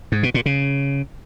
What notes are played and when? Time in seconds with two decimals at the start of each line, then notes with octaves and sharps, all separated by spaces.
0.12 G#2
0.23 B2
0.34 A#2
0.46 C#3